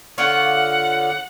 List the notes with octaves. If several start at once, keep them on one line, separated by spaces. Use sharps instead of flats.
D3 F4 C#5 D5 F#5